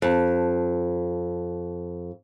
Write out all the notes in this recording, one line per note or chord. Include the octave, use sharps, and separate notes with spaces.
F2 A5